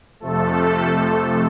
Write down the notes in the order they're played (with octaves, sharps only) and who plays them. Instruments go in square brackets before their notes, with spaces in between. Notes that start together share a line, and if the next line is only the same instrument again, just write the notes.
[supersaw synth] F2 C3 F3 A3 A4